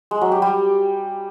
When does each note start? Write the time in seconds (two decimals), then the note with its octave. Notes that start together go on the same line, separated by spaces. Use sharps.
0.11 G#3
0.21 F#3
0.32 G4
0.42 G3